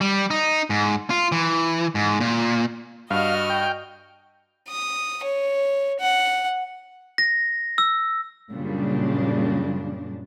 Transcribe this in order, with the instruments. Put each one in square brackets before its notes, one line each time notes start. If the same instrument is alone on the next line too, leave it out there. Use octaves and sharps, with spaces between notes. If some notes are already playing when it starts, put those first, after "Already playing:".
[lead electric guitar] G3
D#4
G#2
F4
E3
G#2
A#2
[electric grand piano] G2 [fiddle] F#4 F6 [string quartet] D#5 [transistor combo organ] F5
[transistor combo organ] G5
[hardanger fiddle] D#6
C#5
F#5
[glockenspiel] A#6
E6
[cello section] F#2 A#2 C#3 G3 D4